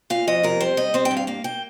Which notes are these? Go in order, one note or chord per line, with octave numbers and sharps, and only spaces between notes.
A#2 F5
F2 D#5
C3 A#4
G3 C5
G3 D#5
C4 C5
G5
G2
F5
A#3 F5
A#3 G5